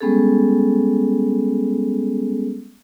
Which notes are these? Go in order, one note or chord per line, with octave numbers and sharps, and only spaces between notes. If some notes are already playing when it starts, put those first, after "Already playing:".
G3 G#3 B3 C#4 G#4 A4